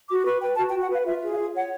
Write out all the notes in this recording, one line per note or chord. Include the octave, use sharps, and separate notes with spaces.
F#4 D6
B4 C#6
B4 G5
F#4 A5
G5
F#4
F#5
B4 F5
F4 E5
G#4
F5
F4
C#5 F#5